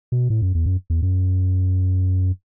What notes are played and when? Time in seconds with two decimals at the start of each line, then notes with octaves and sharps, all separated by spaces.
0.12 B2
0.30 A2
0.42 F#2
0.55 E2
0.66 F#2
0.90 E2
1.02 F#2